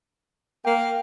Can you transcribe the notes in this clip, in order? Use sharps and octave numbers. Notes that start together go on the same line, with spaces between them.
A#3 G5